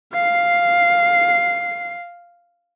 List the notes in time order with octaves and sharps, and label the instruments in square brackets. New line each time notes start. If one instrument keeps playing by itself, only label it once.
[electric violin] F5 C7